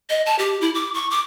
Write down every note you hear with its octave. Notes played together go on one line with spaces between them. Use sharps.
D#5
A5
G4
E4
D6
C#6
D6